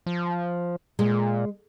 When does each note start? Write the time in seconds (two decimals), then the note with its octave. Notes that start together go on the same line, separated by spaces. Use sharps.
0.06 F3
0.99 A#2 G#3